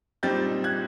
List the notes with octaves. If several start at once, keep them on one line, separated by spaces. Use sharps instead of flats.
A#2 G3 C4 D#4 G6 A6
F#6 G#6